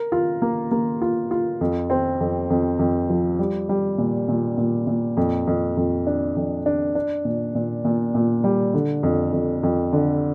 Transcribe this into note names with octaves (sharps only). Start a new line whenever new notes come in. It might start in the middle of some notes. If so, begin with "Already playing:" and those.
Already playing: A#4
F4
A#3
A#3
F4
F4
F2
C4
F2
F2
F2
F3
G3
G3
A#2
A#2
A#2
A#2
F2
F2
F2
D4
F2
D4
D4
A#2
A#2
A#2
A#2
G3
D3
F2
F2
F2
D3